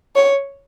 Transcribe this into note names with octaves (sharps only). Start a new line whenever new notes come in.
C#5